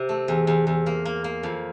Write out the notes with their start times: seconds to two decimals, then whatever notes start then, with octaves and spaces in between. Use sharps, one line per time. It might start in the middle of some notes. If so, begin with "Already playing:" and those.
Already playing: C3
0.09 A3
0.28 E2
0.47 E2
0.67 E2
0.86 A#3
1.05 A#3
1.24 A#3
1.43 F2